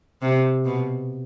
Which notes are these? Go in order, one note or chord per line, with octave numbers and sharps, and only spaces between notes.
C3
B2